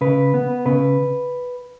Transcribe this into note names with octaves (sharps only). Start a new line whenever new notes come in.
C#3 B4
B3
C#3 B4